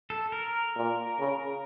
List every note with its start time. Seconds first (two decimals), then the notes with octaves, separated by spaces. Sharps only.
0.10 A4
0.32 A#4
0.76 A#2
1.19 C#3